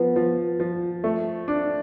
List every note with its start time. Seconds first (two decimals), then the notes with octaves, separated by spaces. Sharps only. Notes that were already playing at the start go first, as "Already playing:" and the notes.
Already playing: F3 B3
0.16 F3
0.60 F3
1.04 A3
1.48 D4